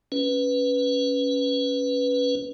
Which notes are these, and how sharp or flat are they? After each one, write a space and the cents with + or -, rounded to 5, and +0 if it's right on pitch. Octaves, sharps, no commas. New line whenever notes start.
C#4 +5 B4 +0